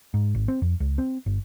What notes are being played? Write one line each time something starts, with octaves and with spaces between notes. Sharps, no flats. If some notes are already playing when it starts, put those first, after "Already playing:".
G#2
G#1
C4
F2
C#2
C4
G1